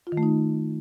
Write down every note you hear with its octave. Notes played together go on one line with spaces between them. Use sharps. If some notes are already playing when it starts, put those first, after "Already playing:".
F4
D#3
A3
D#4